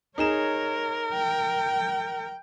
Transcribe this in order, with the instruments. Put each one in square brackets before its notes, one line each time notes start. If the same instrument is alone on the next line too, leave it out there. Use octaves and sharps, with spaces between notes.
[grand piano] D#4 G#4 E7 [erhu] A#4 [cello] C#5
[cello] G5